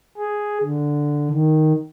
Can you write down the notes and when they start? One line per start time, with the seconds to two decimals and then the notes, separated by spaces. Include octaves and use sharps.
0.18 G#4
0.63 D3
1.30 D#3